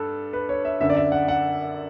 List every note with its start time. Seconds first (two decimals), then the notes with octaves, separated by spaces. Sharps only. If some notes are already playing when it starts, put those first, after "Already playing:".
Already playing: G2 A4
0.33 B4
0.49 C#5
0.65 E5
0.81 F#2 D3 E5
0.90 D5
0.97 E5
1.12 F#5
1.28 F#5